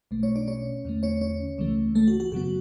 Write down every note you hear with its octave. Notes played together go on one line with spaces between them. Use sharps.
B1 B2 A3
C#4 C#5
D4 D5
C#4 C#5
E2 D3 A3
C#4 C#5
C#4 C#5
C#2 C#3 E3 A3
A3 A4
F#4
F#4
F#2 C#3 F#3 B3 F#4